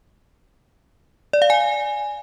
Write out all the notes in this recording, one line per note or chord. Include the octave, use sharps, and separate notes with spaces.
D5
F5
G#5